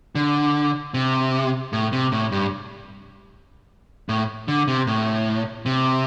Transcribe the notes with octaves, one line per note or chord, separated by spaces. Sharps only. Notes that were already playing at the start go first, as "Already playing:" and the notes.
D3
C3
A2
C3
A2
G2
A2
D3
C3
A2
C3